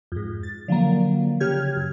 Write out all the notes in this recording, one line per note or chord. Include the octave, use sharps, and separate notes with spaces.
F2 G#2
A6
D3 F3 F#3 A#3
C#3 G4 F6 G#6
F#2